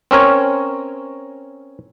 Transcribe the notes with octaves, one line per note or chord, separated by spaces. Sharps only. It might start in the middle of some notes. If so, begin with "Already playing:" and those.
C4 C#4 A#4 C#5